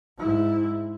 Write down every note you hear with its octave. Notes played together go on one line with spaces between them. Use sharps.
G#2 E4